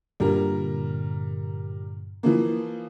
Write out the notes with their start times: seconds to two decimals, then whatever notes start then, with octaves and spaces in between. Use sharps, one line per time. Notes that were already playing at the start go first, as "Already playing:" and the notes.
0.20 G2 A#2 D3 G3 A#4
2.23 E3 F3 A#3